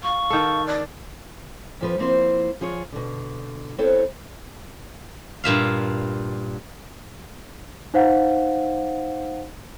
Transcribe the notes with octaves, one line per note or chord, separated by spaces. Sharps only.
F5 C#6
D#3 A4
D5
F2 F3 B4
F3 A#3 C4 E4 C5
F3 F4 G#4 C#5
B2 D3
B3 C4 E4 A4 C5 C#5
G2 A#2 E5 F5
D#4 C5 F5 F#5